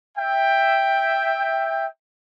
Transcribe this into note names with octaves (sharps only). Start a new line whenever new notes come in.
E5 G5